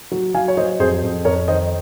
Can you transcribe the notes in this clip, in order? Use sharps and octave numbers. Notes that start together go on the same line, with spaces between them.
F#3
F#3 F5 G#5
C#5
F#3 C5 D#5
F2 G#4 C5
F2
F2 A#4 C#5
D#3 C5 D#5